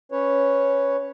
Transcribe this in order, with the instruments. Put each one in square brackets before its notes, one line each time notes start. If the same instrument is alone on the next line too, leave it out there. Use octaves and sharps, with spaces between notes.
[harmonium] C#4 B4 C#5